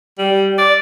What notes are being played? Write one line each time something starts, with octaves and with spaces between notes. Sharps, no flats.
G3
D5